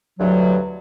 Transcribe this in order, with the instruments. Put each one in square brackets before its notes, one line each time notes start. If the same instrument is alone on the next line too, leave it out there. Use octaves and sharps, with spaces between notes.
[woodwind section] D2 G2 E3 F#3